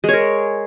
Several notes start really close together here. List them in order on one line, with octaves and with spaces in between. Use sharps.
G#3 C#5 A#4